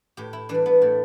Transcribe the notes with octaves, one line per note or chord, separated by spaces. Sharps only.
A2 G4
E4
E3 D4
G3
B3
A2 A3